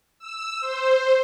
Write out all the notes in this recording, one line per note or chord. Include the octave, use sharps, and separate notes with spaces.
E6
C5